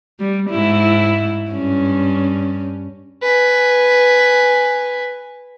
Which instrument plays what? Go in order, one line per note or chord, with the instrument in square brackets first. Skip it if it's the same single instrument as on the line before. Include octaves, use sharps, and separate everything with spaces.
[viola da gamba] G3
G#2 E4
G2 C#4
[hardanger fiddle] B4 G#5